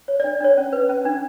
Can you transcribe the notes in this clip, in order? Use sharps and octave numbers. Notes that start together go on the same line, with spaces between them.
C#5
D5
D4
D4 C#5
C#4
B4
C#4
D4